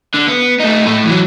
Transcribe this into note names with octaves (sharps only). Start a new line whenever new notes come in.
D3
B3
A3 D#4
A2 A3
E3 F#3